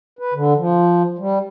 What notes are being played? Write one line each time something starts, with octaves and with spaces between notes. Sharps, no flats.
B4
D3
F3
G3